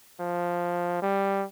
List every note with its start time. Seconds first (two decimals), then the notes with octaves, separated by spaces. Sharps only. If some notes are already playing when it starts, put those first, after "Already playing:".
0.20 F3
1.02 G3